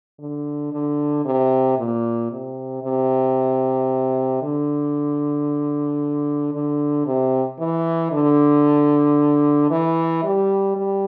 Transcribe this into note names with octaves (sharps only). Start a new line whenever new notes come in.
D3
D3
C3
A#2
C3
C3
D3
D3
C3
E3
D3
E3
G3
G3